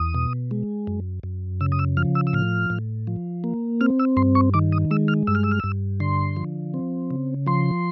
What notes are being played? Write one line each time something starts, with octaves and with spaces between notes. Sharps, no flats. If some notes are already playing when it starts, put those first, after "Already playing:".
Already playing: E2 D#6
B2
G#3
F#2
F#2
C#3 E6
D#6
E6
F3 F6
E6
E6
A2 F6
A2
F3
A#3
C4 F6
E6
G2 C6
C#6
D#3 D6
D#6
G#3 E6
F6
G2 E6
F6
E6
F6
G2 E6
D3 C6
F3
C4
C#3
F3 C6